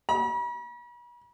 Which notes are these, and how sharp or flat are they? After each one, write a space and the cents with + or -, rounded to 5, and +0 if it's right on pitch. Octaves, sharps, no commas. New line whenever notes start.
B5 -45